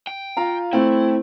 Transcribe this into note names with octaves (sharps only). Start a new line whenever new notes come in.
G5
F4 F5 A#5
A3 C4 E4